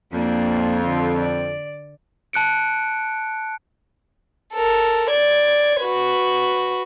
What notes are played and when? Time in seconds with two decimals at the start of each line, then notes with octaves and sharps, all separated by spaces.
0.13 F2 A#3 D4
0.82 D3 F4
1.20 D5
2.33 A5 F#6 C#7 D7
4.54 A4 A#4
5.10 D5 G#6
5.81 F#4 B4